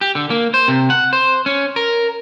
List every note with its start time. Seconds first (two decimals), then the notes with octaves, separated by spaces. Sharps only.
0.01 G4
0.15 D3
0.30 A#3
0.54 C5
0.68 C3
0.90 F#5
1.13 C5
1.46 C#4
1.76 A#4